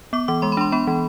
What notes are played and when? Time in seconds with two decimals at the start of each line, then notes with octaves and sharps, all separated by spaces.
0.13 B3 D6
0.28 E3 D6
0.42 G#3 C6
0.52 B5
0.57 D4 C6
0.72 B3 B5
0.87 E3